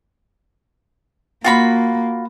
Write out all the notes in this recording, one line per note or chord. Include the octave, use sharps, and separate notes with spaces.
A#3 F4 F#4 B5